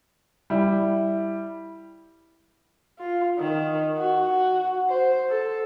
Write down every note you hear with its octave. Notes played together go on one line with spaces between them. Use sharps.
G3 E4
F4
D#3
F#4
C5
A4